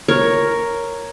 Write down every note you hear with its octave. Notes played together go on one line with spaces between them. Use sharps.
A#4 C#5